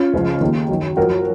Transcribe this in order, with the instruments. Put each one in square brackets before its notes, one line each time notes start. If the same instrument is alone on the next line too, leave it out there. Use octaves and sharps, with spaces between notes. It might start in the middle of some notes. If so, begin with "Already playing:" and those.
Already playing: [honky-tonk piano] C#4 F4
C#2 C#3 F3
D#2 D#3
F#2 D#3
F#2 F3 F#4 A#4